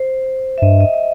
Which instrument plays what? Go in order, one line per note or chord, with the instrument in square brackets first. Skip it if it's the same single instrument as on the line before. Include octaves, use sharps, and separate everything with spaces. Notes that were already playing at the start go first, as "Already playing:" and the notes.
Already playing: [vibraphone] C5
E5
[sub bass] G2 [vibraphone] D#5
[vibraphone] D#5
D#5